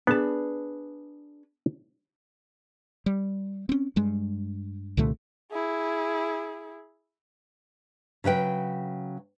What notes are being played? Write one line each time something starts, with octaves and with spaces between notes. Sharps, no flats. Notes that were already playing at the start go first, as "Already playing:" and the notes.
B3 D4 G#4 B4 A5
G3
C4 C#4
G2 G#3
C2 A#2 D3 A3
E4 G#4
C#3 F#3 B4 G5